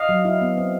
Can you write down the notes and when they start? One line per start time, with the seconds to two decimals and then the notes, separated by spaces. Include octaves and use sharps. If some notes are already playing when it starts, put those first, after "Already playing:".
Already playing: D#5 F5
0.09 F#3
0.25 E4
0.41 B3
0.57 C4